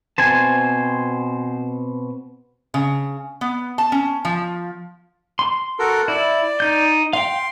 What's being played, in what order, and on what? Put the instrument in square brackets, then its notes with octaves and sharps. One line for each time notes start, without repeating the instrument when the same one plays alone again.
[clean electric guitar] B2 C4 A5 [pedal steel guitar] C5 G#5
[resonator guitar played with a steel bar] C#3
B3
A5
C#4
F3
[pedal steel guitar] C6
[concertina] F#4 A4 A#4
[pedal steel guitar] E4 [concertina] D5
[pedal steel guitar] D#4 G6
[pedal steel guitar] F5 G5 [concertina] C6